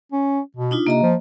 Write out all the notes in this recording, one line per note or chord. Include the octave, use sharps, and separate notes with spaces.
C#4
B2
D4 D#4 F4
C3 A#3 D#5 A#5
F3